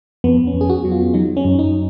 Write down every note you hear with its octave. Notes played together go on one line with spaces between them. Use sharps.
F2 B3
C#4
F2
G#4
F#4
F#3
F4
F#3 D#4
C#4
F#2
D#4